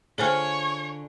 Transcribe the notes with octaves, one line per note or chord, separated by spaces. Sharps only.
D3 F4 G#4 C5 C#5 G#5 F6